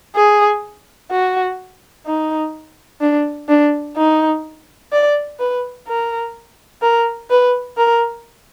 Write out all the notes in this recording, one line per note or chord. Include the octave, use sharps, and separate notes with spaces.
G#4
F#4
D#4
D4
D4
D#4
D5
B4
A#4
A#4
B4
A#4